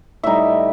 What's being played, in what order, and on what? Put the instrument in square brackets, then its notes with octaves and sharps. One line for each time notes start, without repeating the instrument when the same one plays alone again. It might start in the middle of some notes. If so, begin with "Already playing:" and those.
[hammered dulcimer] A2 G3 D#4 E5